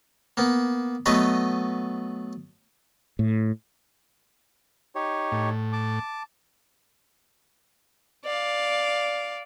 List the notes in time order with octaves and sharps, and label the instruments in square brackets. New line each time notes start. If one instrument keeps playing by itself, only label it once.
[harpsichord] A#3 B3
F#3 A3 B3 B4 D#5
[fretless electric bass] A2
[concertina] D#4 G4 C#5
[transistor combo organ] A2
[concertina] A5 D6
[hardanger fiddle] D5 F5